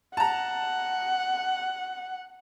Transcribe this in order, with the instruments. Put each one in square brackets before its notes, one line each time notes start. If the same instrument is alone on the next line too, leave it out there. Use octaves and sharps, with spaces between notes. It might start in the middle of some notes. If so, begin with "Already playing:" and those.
[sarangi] F#5 [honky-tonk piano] A5 A#5